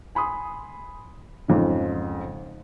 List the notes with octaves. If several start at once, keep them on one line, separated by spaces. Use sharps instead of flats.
G#5 B5 C6 D#6
F2 G#2 C#3